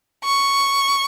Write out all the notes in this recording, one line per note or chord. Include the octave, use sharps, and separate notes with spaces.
C#6